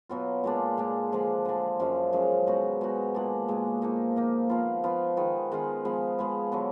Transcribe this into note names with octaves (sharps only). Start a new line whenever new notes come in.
B2 F#3 B3 F4
A#2 G#3 D4
A#2 G#3 D4
D3 F3 G#3 D4
D3 F3 G#3 D4
F#2 F3 G#3
F#2 F3 G#3
B2 G#3 D#4 F#4
B2 G#3 D#4 F#4
A#2 G#3 D4
A#2 G#3 D4
F3 A#3 D#4
F3 A#3 D#4
F3 B3 F4
F3 B3 F4
D#3 G#3 B3 F4
D#3 G#3 B3 F4
F3 G#3 B3
F3 G#3 B3
D3 F#3 B3